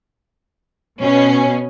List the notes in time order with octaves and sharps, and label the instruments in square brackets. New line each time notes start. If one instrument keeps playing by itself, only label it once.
[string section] B2 C#4